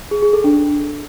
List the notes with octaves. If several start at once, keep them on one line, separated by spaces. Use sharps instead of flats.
G#4
G#4
A4
D4